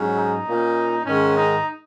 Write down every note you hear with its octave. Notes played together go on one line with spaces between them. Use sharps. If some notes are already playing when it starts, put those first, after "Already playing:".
Already playing: G#2 F#3 C#4
D#4
A#2 A#3 C#4
G#2 D#3 G#3 C#4
D#4